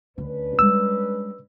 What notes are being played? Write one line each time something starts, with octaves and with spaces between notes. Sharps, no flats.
D2 C#4 D4 B4
G3 G#3 E6